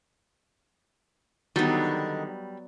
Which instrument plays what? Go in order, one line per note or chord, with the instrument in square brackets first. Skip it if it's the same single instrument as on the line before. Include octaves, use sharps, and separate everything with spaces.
[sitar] D3 D#3 [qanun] F#3 B3 [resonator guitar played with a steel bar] G3